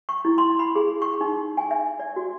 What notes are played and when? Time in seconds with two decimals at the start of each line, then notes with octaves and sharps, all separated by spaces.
0.09 C#6
0.25 E4
0.38 C6
0.59 B5
0.76 G#4
1.02 C#6
1.21 D#4
1.57 G#5
1.71 E5
1.99 D5
2.16 F#4